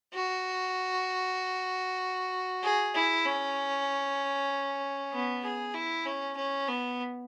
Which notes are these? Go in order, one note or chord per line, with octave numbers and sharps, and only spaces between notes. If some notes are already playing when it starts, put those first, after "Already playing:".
F#4
G#4
E4
C#4
B3
G#4
E4
C#4
C#4
B3